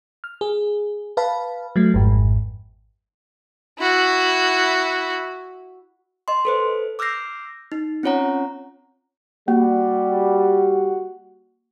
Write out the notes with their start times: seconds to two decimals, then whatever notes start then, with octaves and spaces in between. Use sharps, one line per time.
0.24 F6
0.41 G#4
1.17 B4 F5 A5 B5
1.76 F#3 A3
1.94 G#1 F2 G#2
3.79 E4 F#4
6.28 D#5 C6
6.45 A4 B4 C5
6.99 D6 E6 F6 G6 A#6 C7
7.72 D#4
8.03 C4 C#4 F4 C#5 F#5 A#5
9.48 G3 A#3 F#4